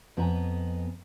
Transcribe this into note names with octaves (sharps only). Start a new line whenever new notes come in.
F2 B3 B4 D#5 G#5 A#5